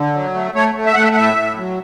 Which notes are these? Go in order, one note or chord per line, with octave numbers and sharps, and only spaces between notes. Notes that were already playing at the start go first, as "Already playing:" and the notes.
Already playing: D3
F#3
A3
A3 C#5
A3
E5
A3 F#5
E5
F#5
A2 E5
A2
F#3